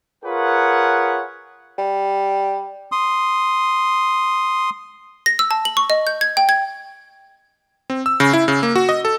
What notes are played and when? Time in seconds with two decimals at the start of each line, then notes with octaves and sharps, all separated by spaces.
0.25 F4 G#4 A#4 B4 C#5 F#5
1.78 G3
2.92 C6 D#6
5.26 A#6
5.39 E6
5.51 A5
5.65 F#7
5.77 C#6
5.90 D#5
6.07 G6
6.21 G#6
6.37 G5
6.49 G#6
7.90 C4
8.06 E6
8.20 C#3
8.33 E4
8.48 C#3
8.63 A#3
8.76 F#4
8.89 D#5
9.05 A4